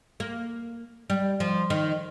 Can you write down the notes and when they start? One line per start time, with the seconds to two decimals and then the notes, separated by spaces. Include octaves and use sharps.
0.20 A#3
1.10 G3
1.40 F3
1.70 D#3